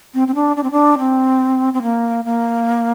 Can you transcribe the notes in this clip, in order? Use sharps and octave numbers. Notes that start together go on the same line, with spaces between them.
C4
C4
D4
D4
C4
D4
C4
C4
A#3
A#3